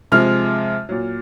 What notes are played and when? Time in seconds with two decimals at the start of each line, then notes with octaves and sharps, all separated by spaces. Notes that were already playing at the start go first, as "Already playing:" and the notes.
0.12 C3 F3 G#3 F6
0.89 A#2 F#3